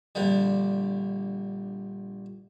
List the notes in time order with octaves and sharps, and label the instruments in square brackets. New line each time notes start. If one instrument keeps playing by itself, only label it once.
[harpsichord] A#1 D3 G3